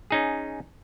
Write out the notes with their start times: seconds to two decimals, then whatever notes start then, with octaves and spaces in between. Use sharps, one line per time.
0.11 C#4 D#4 G#4